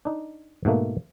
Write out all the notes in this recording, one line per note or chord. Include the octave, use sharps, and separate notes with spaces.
D4 D#4
G#2 B2 A3 A#3